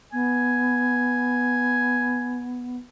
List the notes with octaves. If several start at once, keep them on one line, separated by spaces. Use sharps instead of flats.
B3 G#5